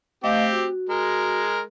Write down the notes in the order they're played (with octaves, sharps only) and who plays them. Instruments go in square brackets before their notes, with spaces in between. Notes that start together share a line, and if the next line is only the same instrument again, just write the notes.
[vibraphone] A3 D#5 F5 [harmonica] C4 G4
[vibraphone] F#4
[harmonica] G#3 A#4